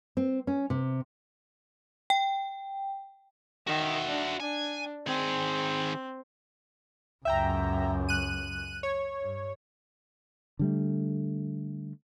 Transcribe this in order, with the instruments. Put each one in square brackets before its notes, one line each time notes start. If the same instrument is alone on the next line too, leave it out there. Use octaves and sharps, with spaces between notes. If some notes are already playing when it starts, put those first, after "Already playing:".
[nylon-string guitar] C4
C#4
C3
[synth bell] G5
[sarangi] D#3 [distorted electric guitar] F#4 E5
[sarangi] D4
[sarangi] D4 [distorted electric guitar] G#5
[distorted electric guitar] D#3 G#4 [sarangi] C4
[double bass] C#2 F#2 [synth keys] E5 G5 A#5
[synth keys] F#6 D#7
C#5
[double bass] G2
[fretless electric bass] D3 G3 A3